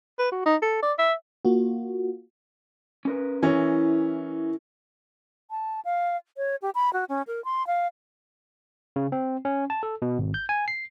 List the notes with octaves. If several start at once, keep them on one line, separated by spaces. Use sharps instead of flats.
B4
F#4
D#4
A4
D5
E5
A#3 F4 F#4
C#4 A#4 B4
E3 C#4 E4 A#4 G#5
A5
F5
C#5
G4
B5
F#4
C#4
A#4
C6
F5
C#3
C4
C#4
A5
A4
B2
G#1
G6
G#5
C7